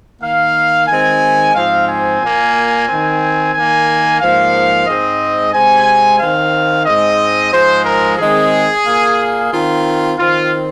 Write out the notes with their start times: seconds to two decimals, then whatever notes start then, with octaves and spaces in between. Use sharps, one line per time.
0.21 D#3 A#3 F5
0.87 D#3 G#3 C4 G#5
1.54 G#2 F3 C4 F5
1.88 G#5
2.21 A#2 A#3
2.87 D#3 C4
3.53 D#3 A#3 G#5
4.20 G#2 F3 A#3 F5
4.86 G#2 G#3 C4 D#5
5.53 C3 G#3 C4 G#5
6.19 D#3 C4 F5
6.85 G#2 G#3 C4 D#5
7.52 G#2 F3 G#3 C5
7.85 A#4
8.18 D#3 G#3 C4 G#4
8.85 A#2 A#3
9.51 D#3 C4 F4
10.18 D#3 C4 F4